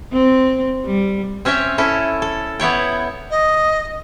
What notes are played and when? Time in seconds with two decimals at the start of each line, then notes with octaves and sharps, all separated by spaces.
0.13 C4
0.86 G3
1.45 C4 C#4 C#5 E5 G5
1.78 C#4 E4 A4
2.22 A4
2.60 B3 E4 C#5 G5
3.31 D#5